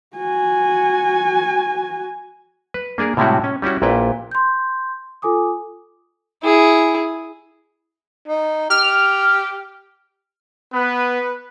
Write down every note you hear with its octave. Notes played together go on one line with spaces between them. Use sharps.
F#4 G#5
B4
A#3 D4 G#4 A#4
A2 C3 G3 G#3 E4 F#4
C#4
G3 C#4 E4 F#4
A#1 A#2 E4 B4 G5
C6 G6
F4 A4 G#5 D6 D#6
E4 G#4
D#4
G4 F6
B3 B4